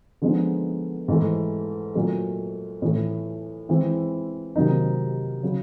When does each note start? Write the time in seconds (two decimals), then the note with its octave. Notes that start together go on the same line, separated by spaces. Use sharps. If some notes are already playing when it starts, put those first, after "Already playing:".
0.22 D3 F3 G#3 B3 D#4
1.08 G#2 E3 A3
1.95 A#2 F#3 A3
2.82 A2 E3 A3
3.69 E3 G#3 C4 E4
4.56 C3 D#3 F#3 A#3 D#4
5.43 C#3 F#3